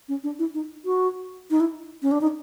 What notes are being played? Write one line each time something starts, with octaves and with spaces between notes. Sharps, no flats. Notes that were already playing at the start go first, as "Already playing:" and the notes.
C#4
D4
E4
D#4
F#4
D#4
E4
C#4
D4
D#4